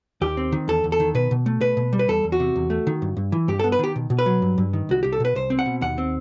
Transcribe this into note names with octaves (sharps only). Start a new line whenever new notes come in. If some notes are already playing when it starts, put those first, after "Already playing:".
D#2 G4
C4
D#3
E2 A4
E2
A4
D#3
B2 B4
B2
A3
B2 B4
B2
G3
B4
E2 A4
E2
F#4
C3
E2
A3
D#3
G2
G2
E3
G2 G4
A4
B3
B4
D#3 G4
B2
B2
B4
F#3
G2
G2
D#3
C2 F#4
C2 G4
A4
B2 B4
C2 C5
C4
F#5
B2
D#2 F#5
C4